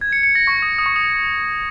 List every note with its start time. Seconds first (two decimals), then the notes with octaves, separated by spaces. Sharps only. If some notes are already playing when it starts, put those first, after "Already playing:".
0.01 G#6
0.12 C#7
0.23 C#7
0.35 A#6
0.47 C#6
0.62 D#6
0.78 D#6
0.86 C#6
0.96 D#6